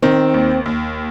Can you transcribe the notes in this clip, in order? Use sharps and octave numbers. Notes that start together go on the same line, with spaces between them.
D#3 C4
D#2
D#2